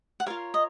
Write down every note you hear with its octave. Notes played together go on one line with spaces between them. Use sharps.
F#5
F4 A#4 C#5 F5
D#5